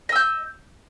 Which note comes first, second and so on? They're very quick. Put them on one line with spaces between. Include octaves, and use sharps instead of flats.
D#5 E6 G6